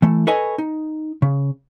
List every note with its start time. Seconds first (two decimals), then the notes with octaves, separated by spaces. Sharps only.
0.02 E3 A3
0.27 A4 B4 C#5 D#5 G#5
0.58 D#4
1.22 C#3